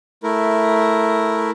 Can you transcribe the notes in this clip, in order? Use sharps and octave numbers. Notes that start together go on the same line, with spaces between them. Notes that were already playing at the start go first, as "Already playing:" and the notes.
A3 E4 A#4